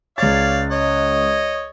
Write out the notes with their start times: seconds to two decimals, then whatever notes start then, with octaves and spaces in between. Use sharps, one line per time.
0.18 C#2 C#5 D5 F5 A6
0.71 C#5 D#5